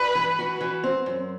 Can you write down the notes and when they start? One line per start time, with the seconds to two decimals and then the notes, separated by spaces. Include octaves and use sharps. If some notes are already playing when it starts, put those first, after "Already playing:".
Already playing: G2 B4
0.15 E3
0.39 F#4
0.61 E3
0.83 C4
1.06 F#2